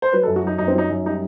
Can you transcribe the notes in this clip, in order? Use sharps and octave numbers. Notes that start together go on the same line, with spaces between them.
C5
F#3 B4
A4
F#2
F#4
F#3 D#4
F#2 D#4
C4
F#3 D#4
F#2
G3 D#4